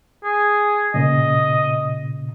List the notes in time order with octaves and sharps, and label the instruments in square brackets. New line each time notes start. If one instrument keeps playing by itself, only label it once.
[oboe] G#4
[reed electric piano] A#2 C#3 [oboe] D#5